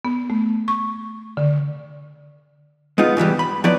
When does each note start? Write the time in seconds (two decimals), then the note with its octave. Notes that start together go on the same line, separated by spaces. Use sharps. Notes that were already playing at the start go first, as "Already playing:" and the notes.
0.05 B3
0.30 A3
0.68 C#6
1.37 D3
2.98 G#3 B3 D#4 F4
3.17 G#2 B2 E3 G3
3.39 B5
3.64 F3 F#3 B3 E4 D5